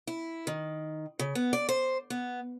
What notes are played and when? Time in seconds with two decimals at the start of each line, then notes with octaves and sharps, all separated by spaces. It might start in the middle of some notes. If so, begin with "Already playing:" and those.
0.07 E4
0.47 D#3
1.19 C#3
1.35 B3
1.53 D5
1.69 C5
2.10 B3